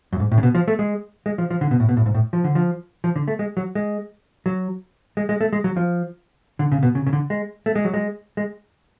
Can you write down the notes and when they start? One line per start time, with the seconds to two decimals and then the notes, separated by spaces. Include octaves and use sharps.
0.13 F#2
0.20 G#2
0.32 A2
0.38 C#3
0.43 B2
0.55 F3
0.68 A3
0.79 G#3
1.26 G#3
1.38 F3
1.50 F3
1.61 D3
1.71 B2
1.80 A2
1.89 B2
1.97 A2
2.06 G#2
2.14 A2
2.33 F3
2.44 D3
2.55 F3
3.04 F3
3.16 D3
3.28 A3
3.39 G#3
3.57 F#3
3.75 G#3
4.46 F#3
5.17 G#3
5.29 G#3
5.41 A3
5.53 G#3
5.64 F#3
5.77 F3
6.59 D3
6.72 C#3
6.83 B2
6.95 C#3
7.07 C#3
7.13 D3
7.30 G#3
7.66 A3
7.75 G#3
7.85 F#3
7.94 G#3
8.37 G#3